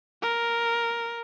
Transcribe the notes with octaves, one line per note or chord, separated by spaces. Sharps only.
A#4